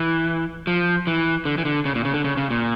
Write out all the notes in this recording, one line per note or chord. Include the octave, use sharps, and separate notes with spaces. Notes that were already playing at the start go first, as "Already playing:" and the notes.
Already playing: E3
F3
E3
D3
E3
D3
C#3
A#2
C#3
D3
C#3
C#3
A#2